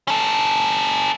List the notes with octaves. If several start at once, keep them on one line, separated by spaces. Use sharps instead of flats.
C#4 A4